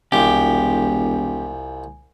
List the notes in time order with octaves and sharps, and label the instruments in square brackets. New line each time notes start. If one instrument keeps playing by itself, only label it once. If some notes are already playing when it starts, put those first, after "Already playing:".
[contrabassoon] E1 [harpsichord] C2 F3 [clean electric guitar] G4 [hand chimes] G#5